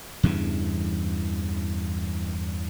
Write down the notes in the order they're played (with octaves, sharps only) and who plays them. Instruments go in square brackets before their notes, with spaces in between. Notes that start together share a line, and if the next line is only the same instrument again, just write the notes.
[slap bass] E2 G2 C#3 E3